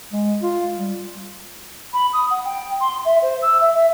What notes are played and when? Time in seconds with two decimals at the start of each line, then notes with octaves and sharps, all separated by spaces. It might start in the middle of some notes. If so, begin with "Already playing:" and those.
0.12 G#3
0.42 F4
0.77 G3
1.93 B5
2.12 D#6
2.30 F#5
2.44 G5
2.80 C6
3.04 E5
3.21 C5
3.41 E6
3.60 E5
3.73 E5